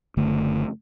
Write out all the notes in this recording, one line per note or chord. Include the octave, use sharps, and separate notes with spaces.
F#1 D3 A3